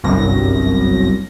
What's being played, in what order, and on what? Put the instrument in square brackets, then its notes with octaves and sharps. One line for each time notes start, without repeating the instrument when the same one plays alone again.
[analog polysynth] G1 C2 F#2 A#6